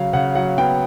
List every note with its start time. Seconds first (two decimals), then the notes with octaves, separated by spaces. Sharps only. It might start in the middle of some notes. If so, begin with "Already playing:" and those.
Already playing: C#3 F#3 F5
0.13 C#3 F#5
0.35 F#3 F#5
0.58 B3 G5